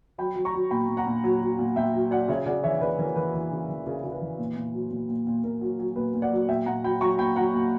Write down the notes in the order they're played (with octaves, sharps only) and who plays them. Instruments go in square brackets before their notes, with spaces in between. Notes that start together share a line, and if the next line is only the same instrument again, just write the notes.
[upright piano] F#3 G5 B5
F#3
A#5 C#6
F#3
A#2 G5 B5
A#2
F#5 A#5
A#2
F#3
F#3
A#2
A#2 E5 G5
F#3
F#3 D5 F#5
C#3 C#5 E5
C#3 D5 F#5
E3 C#5 E5
C#3 B4 D5
E3 A#4 C#5
E3 B4
E3
C#3
E3
C#3 A#4
C#3
B4
E3
A#2
A#2
F#3
A#2
A#2
A#2
A#2 A#4
F#3
F#3
A#2 B4
A#2
D5 F#5
F#3
A#2 E5 G5
A#2 F#5 A#5
F#3 G5 B5
F#3 A#5 C#6
A#2 G5 B5
F#3 F#5 A#5
A#2